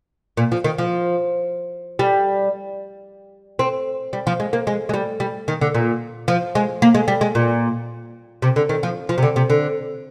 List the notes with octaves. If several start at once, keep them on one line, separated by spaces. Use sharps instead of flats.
A#2
F3
D#3
F3
G3
C4
G3
F3
G#3
A#3
G#3
G#3
G3
G3
D#3
D3
A#2
F3
G#3
A#3
G#3
G3
G#3
A#2
C3
D3
D#3
F3
F3
C3
D3
C3
D3